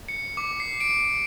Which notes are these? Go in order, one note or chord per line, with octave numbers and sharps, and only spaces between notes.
C#7
D6
C7
D7